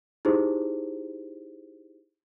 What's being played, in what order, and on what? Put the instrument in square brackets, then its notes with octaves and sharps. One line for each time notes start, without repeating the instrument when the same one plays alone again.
[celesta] D#4 E4 G4 G#4 C5